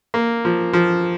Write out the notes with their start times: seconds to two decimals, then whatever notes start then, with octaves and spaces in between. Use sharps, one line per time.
0.14 A#3
0.45 F3
0.73 F3